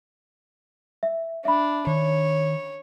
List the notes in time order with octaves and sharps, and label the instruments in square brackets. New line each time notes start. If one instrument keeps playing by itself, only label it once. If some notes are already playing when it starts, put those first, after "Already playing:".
[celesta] E5
[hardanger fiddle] D4 [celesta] E5 B5
[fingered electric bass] D#3 [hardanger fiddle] C#5